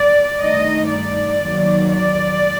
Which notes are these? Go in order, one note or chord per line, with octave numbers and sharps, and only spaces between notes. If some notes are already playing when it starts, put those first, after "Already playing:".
Already playing: D5
G2 D#3 A3 D#4 D#5
D5
D#2 D#3 F#3
D5